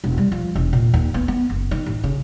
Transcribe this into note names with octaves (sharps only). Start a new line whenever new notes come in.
E1
G3
F3
E1
A#2
D#2
B3
B3
F#1
D#3
A1
C#3